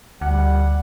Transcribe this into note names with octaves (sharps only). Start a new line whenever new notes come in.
D2 G3 F#5